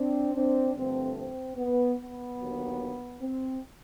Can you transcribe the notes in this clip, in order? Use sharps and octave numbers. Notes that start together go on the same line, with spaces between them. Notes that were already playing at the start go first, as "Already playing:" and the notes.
Already playing: C4 D4
C4 D4
G2 D3 F3 A3 C4
C4
B3
B3
D#2 D3 F#3
C4